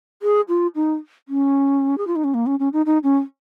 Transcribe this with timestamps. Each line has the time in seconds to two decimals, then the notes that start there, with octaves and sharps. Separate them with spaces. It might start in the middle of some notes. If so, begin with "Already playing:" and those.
0.22 G#4
0.49 F4
0.75 D#4
1.29 C#4
1.98 G#4
2.07 F4
2.16 D#4
2.24 C#4
2.34 A#3
2.46 C#4
2.59 C#4
2.73 D#4
2.86 D#4
3.03 C#4